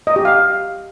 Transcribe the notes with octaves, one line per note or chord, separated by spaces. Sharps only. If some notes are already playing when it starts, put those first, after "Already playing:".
D#5
G4
F5